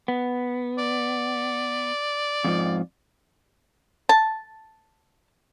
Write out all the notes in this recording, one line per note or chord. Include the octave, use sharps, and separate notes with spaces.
B3
D5
F2 G#2 F3
A5